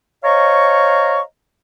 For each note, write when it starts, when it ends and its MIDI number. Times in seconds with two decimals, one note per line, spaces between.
0.24 1.21 72
0.24 1.21 73
0.24 1.21 75
0.24 1.21 77
0.24 1.21 82
0.24 1.21 85